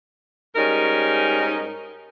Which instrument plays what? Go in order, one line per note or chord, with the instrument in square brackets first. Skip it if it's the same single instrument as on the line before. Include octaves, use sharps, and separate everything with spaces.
[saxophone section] G#2 G3 C#4 D#4 A#4